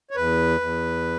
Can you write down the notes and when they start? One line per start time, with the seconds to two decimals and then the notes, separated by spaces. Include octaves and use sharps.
0.11 C#5
0.16 E2 B4
0.61 E2